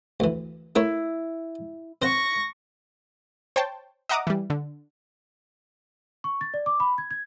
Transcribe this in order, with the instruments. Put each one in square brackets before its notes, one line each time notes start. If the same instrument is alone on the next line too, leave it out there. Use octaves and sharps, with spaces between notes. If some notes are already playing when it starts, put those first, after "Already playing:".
[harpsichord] D2 E3
[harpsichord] A3 A#4 C#5 [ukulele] E4
[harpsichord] C4 C5 F#5 [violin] C#6 A#6
[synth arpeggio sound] C5 C#5 G5 A5
D#5 E5 F#5 A#5 D6 D#6
E3 G3
D3
[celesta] C#6
A6
D5
D6
B5
G#6
G#6